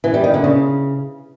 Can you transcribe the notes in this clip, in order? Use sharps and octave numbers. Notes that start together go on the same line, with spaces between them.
E3
G3
D#3
D3
C#3